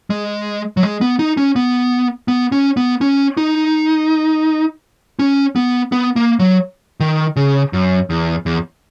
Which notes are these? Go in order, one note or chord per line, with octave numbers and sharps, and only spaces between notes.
G#3
F#3
G#3
B3
D#4
C#4
B3
B3
C#4
B3
C#4
D#4
C#4
B3
B3
A#3
F#3
D#3
C#3
F#2
E2
E2